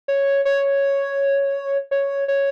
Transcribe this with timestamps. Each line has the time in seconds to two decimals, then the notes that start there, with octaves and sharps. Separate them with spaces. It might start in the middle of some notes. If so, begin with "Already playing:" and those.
0.08 C#5
0.45 C#5
1.91 C#5
2.28 C#5